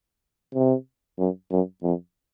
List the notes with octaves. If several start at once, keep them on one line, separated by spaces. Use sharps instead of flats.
C3
F#2
F#2
F2